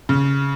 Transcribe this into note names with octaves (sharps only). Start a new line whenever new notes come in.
C#3